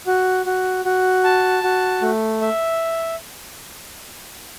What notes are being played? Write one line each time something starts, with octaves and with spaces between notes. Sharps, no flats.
F#4
F#4
F#4
A5
F#4
A3
E5